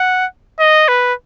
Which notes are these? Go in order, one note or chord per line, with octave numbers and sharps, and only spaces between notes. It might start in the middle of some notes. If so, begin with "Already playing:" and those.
Already playing: F#5
D#5
B4